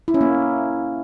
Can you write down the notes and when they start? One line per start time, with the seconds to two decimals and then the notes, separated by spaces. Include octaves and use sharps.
0.08 E4
0.14 C#4
0.21 A#3